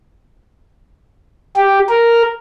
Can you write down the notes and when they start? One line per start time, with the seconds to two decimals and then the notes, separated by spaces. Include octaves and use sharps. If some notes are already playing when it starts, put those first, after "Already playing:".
1.57 G4
1.90 A#4